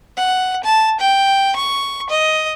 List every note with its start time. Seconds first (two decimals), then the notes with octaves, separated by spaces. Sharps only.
0.17 F#5
0.64 A5
1.00 G5
1.56 C#6
2.10 D#5